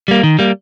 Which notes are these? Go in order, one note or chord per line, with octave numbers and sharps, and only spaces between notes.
G3 A#3
D#3
G3 A#3